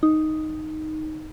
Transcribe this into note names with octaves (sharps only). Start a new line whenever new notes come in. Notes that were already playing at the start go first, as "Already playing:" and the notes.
D#4